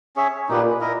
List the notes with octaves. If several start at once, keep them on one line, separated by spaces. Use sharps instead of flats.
C#4 G#4 C#5 E5
A#2 D#4 G4 B4
E4 A#4 D#5